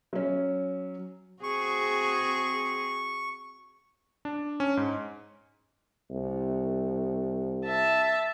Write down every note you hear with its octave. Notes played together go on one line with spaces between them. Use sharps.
F#3 C#4
C4 F#4 G#4 C#6
D4
C#4
G#2
C2
E5 A5